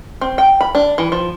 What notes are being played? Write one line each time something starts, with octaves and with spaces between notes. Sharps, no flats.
C4
G5
B5
D4
E3
F3